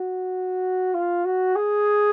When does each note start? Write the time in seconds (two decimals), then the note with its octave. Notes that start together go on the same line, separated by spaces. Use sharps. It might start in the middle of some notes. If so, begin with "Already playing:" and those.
Already playing: F#4
0.94 F4
1.25 F#4
1.56 G#4